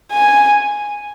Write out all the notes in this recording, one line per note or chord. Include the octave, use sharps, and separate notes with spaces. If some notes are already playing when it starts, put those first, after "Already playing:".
G#5